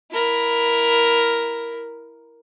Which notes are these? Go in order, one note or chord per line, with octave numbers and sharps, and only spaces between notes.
E4 A#4